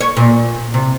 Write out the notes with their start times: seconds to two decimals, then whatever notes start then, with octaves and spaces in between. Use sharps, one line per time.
0.01 C#5
0.17 A#2
0.74 C3